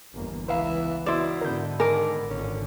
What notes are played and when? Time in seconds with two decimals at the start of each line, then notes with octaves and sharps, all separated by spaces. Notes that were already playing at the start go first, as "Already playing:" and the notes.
0.13 G1 E2 A#3
0.48 C#2 E3 B3 E4 B4 F5 A#5
1.06 B2 E4 D5 C6 E7
1.41 G#2 D3 B3 A#4 G6
1.80 D#3 A#4 G#5 D6
2.30 G#1 A#2 D3 C#4